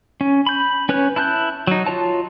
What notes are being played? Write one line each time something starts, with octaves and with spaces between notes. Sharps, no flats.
C#4
B5 G6
C#4 B4 C#5 F#6
E4 A5 F#6 G6
F#3 D#4
F4 C#5 A5